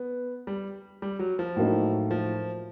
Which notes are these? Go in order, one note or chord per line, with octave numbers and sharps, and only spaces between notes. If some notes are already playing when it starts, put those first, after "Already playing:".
Already playing: B3
G3
G3
F#3
F3
A2 F#3 A#3 D#4
F3